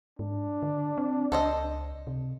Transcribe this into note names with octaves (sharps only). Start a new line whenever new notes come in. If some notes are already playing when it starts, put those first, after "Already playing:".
G#2 D4
D3
C4
C#2 A4 C5 D#5
C3